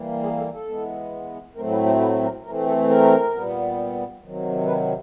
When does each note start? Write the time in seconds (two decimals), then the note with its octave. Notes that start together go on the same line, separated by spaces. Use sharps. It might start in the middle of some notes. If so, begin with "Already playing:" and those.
Already playing: E3 G3 A#3
0.23 G#4
0.38 A4
0.52 A4
0.67 E3 G#3 B3
1.55 A2 F#3 A3 C4 A#4
1.71 B4
1.86 C5
2.00 B4
2.22 A#4
2.44 E3 A3 C4 A#4
2.66 A4
2.89 A#4
3.33 A#2 G3 B3
4.22 C3 D#3 F#3
4.66 B4